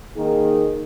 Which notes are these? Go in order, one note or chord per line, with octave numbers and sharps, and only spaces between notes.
D#3 A#3 D#4 G#4